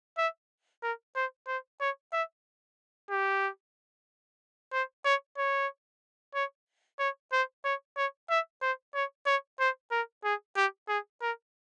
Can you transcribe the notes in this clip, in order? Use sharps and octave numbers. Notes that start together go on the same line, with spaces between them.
E5
A#4
C5
C5
C#5
E5
G4
C5
C#5
C#5
C#5
C#5
C5
C#5
C#5
E5
C5
C#5
C#5
C5
A#4
G#4
G4
G#4
A#4